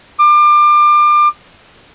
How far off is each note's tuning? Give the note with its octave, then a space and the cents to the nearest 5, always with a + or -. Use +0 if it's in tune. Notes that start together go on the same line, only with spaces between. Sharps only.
D6 +30